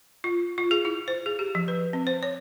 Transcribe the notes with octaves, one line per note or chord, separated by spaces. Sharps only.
F4
F4
G#4
E4
C5
G#4
G4
F3
B4
C4
C5
C#5